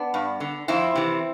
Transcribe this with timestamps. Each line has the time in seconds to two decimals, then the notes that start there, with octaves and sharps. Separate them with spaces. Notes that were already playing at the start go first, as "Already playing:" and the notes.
Already playing: B3 D4
0.14 G2
0.40 D3
0.68 F2 C4 E4
0.96 C3 E3